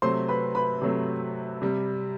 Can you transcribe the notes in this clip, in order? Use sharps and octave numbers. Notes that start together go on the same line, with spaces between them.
C3 F#3 A3 C5 C6
B4 B5
B4 B5
C3 F#3 A3
C3 G3